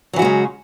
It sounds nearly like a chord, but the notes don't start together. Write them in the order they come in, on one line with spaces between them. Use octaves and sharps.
F#3 E3 F#4 G#3 C#3